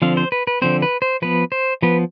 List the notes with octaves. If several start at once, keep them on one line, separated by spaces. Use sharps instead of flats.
D3 F3 C4 F5
C5
B4
B4
D3 F3 C4 C5
B4
C5
F3 B3 B4
C5
F3 B3 B4